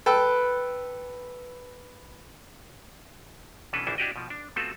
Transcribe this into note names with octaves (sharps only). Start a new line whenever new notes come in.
A4 B4 G5 E6
B2 E3 C#4 D4 A4 B4
A#1 E3 C#4 D4 C5
D4 E4 F#4 G4 D5 D#5
B2 F3
D4
A3 B3 C4 F4 F#4 A4